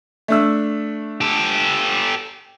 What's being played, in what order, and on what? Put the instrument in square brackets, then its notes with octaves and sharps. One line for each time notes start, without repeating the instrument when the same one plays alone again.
[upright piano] A3 D4 E6
[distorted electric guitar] G4 A4